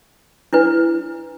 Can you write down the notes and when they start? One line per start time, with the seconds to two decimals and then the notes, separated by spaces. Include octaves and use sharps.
0.53 D4 E4 B4